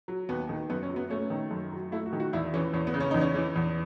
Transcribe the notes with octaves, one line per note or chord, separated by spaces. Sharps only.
F#3
D#2 B3
D#3
F#2 B3
C#4
F#3
B3
A3 C#4
D#3
F#2
F#3
A3 E4
F#4
D#3
F#4
E2 E4
E3 C#4
E2 C#4
B3
C#3
C#4
E2 D#4
C#4
E3
E2